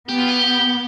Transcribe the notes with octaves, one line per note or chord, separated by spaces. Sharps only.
B3 G4
F4
G4